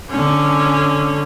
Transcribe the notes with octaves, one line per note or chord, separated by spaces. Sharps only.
D3 C#4